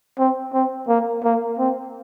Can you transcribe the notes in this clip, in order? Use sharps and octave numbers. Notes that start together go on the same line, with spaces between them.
C4
C4
A#3
A#3
C4